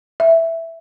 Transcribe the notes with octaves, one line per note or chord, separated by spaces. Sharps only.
E5